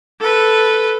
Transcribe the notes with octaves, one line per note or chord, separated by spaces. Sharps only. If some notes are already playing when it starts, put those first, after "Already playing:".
A4 B4